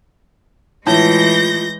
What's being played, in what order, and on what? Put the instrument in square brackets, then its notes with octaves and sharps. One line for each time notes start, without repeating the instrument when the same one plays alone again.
[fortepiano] A2 [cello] E3 G#3 [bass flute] F4 [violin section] G6 A#6